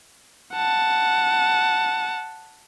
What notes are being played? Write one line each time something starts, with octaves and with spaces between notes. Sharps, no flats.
F#5 A5